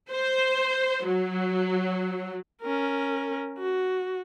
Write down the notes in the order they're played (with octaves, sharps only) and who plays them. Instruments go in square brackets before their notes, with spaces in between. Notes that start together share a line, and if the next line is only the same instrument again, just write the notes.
[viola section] C5
F#3
[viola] C#4 A#4
F#4